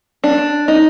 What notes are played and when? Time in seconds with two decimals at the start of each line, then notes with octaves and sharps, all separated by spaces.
0.24 D4
0.68 D#4